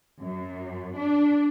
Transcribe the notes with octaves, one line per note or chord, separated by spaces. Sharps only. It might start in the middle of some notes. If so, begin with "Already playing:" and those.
F#2
D4